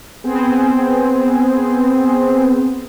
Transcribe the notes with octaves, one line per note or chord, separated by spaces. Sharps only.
B3 C4 G#4 C5